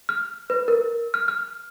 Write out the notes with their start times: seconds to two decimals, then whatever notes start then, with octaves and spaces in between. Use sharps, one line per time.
0.09 F6
0.50 B4
0.68 A#4
1.14 F6
1.28 F6